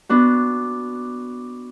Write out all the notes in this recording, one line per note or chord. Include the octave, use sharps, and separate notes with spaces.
B3 D4 F#4